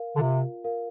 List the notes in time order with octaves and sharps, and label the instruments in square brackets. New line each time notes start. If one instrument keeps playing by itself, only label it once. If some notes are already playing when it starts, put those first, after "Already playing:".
Already playing: [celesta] A#4 F5
[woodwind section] D3
[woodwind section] C3 [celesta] F4
[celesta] A#4 F5